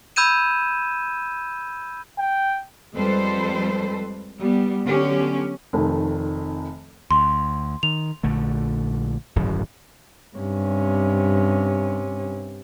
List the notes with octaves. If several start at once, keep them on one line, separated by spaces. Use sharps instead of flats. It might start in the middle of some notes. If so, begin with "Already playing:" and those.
B5 E6 G6 G#6 D#7 E7
G5
F2 G3 G#3 A4 B4 C5
G3 B3
D3 F#3 B3 C#4 G4
F1 F2 D#3
D2 C6
D#3 F7
A#1 D3 A3
D1 G#1 F#2
G2 C3 C#4